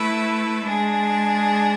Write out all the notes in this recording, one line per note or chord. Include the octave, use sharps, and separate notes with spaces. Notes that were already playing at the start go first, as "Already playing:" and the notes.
Already playing: A3 E4 B4 E5
G#3 D4 G#4